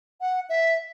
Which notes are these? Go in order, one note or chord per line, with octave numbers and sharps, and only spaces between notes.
F#5
E5